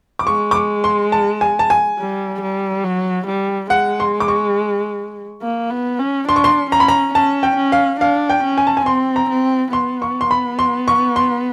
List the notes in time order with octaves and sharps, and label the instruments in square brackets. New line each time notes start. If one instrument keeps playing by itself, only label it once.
[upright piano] D6
[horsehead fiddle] G#3 [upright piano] C#6
[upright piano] D6
C#6
C6
A5
G#5
A5
G#5
[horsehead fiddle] G3
G3
F#3
G3
[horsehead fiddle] G#3 [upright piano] F#5
[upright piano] C6
D6
C#6
[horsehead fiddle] A#3
B3
C#4
[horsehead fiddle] D4 [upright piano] C6
[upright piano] C#6
C6
[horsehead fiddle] C#4 [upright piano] A#5
[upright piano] B5
A#5
[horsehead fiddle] C#4 [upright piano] A5
[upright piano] G5
[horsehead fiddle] C#4
[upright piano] F5
[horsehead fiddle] D4 [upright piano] F5
[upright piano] G5
[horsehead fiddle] C#4
[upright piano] G#5
A5
G#5
[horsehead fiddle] C4 [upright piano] C6
[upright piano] A#5
[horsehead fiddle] C4
[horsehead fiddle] B3 [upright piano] C6
[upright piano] C#6
C6
B5
C6
C#6
C6